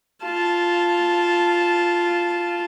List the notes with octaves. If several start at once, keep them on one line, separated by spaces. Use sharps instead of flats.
F4 A5